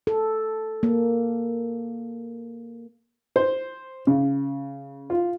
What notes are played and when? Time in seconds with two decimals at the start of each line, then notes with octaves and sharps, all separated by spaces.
0.07 A4
0.83 A#3
3.36 C5
4.07 C#3
5.10 F4